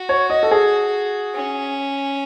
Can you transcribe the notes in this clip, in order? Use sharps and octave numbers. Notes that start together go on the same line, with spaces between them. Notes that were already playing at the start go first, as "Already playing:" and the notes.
Already playing: F#4
C#5
D#5
A4
G#4
C#4